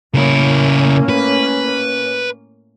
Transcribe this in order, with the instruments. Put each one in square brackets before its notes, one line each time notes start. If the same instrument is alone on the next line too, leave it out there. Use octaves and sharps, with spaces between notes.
[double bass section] A2 A#3 C#4 [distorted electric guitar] C#3 E4
[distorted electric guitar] B4